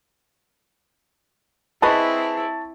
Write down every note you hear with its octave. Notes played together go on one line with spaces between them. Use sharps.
C4 E4 G#4 B4 D#5 A5 B5 C#6